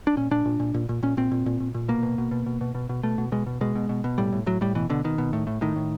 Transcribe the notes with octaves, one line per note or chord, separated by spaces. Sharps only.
D4
A#2 C#4
A#2 D4
A#2
A#2
A#2
A#2
A#2 C#4
A#2 C4
A#2
A#2
A#2
A#2
B2 A#3
B2
B2
B2
B2
B2
B2
B2
B2 A3
B2
B2 G#3
B2
B2 G#3
B2
B2
B2
A2 G3
A2
A2 F#3
A2 G3
B2 E3
B2 D3
B2 D#3
B2
A2
A2
A2 D#3
A2